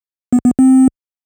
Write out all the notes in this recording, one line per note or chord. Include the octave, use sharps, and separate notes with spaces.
B3
B3
C4